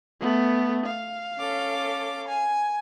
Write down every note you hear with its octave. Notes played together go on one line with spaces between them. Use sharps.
A3 B3
F5
C#4 A4 D6
G#5